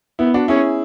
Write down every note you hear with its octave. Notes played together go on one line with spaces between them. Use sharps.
B3 E4
D4 F#4
C#4 E4 G#4